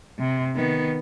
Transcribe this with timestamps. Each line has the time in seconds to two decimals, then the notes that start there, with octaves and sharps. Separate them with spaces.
0.19 C3
0.56 D#3 B3